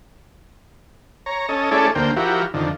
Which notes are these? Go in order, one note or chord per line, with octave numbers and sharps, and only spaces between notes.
C#5 A#5
C#4 A4 D#5
A3 C#4 E4 G#4 A4 D5
D2 A#3 C5 G5
F3 E4 F#4 G4 A#4
F2 D3 D#3